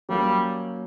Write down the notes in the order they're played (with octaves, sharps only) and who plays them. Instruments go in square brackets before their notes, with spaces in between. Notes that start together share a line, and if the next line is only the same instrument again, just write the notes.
[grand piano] F#3 A#3 C#4 [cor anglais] G3